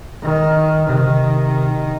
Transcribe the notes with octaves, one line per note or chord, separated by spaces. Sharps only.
D#3
C3 D#3